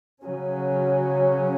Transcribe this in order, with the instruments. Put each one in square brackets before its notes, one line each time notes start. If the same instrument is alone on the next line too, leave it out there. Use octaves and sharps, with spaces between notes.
[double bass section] C#3 F#3 C#4